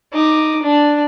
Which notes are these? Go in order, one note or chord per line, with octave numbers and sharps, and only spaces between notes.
D#4 D6
D4